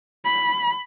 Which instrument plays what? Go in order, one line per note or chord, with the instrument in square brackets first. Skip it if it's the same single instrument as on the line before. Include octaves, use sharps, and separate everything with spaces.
[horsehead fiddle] B5